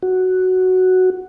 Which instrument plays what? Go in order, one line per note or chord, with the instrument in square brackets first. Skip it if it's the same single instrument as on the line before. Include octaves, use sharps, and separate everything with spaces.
[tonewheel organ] F#4